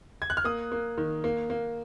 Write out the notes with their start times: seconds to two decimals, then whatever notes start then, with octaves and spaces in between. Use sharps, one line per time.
0.22 G#6
0.30 F#6
0.37 F6
0.44 A#3 D#6
0.72 A#3
0.98 D#3
1.24 A#3
1.50 A#3